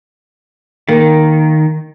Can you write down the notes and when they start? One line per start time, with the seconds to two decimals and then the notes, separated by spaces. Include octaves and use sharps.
0.89 D#3 A#3